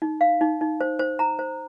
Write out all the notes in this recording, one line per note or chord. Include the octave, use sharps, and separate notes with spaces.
D#4
F5
D#4
D#4
C5
C5
A#5
C5